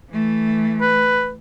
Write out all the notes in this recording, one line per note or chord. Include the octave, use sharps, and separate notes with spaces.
E3 A3
B4